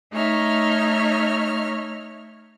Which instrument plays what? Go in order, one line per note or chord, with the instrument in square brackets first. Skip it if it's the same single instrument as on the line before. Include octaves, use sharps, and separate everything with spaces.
[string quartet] A3 D#4 C#5 E5 F6